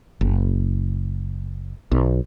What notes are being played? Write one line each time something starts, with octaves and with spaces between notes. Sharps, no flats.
F#1
B1